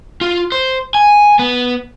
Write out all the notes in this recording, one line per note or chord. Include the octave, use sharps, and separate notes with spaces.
F4
C5
G#5
B3